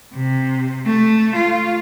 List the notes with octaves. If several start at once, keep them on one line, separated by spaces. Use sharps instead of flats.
C3
A3
F4